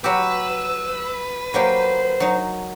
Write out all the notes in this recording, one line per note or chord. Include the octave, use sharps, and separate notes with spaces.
F#3 F#4 G4 B4 E6
F#3 A#3 G4 C5
F#3 D#4